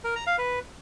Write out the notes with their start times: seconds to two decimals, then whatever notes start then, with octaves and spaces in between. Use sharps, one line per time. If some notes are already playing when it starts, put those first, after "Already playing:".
0.04 A#4
0.16 A#5
0.27 F5
0.38 B4